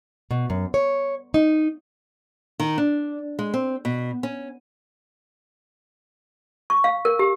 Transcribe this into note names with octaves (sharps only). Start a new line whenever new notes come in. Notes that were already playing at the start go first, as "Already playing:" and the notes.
B2
F#2
C#5
D#4
D#3
D4
G#3
C4
B2
C#4
C#6
F5
A#4
G4